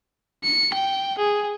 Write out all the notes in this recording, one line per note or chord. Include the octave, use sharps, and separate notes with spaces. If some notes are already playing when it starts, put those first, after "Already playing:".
C#7
G5
G#4